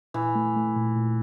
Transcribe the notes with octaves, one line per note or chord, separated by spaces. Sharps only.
A#2 E3
A3
A3
A#2
A#2